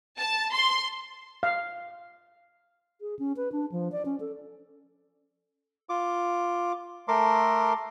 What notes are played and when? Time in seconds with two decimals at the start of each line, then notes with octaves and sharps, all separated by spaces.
0.18 A5
0.53 C6
1.43 F5
3.01 G#4
3.19 C#4
3.37 B4
3.52 D4
3.72 F3
3.92 D5
4.05 C#4
4.20 A4
5.89 F4 D6
7.08 A3 A4 A#4 C6 D6